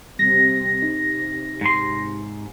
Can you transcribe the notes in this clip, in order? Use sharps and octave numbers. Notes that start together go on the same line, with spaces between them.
C3 G3 C4 A#6
C3 D#4
G#2 C6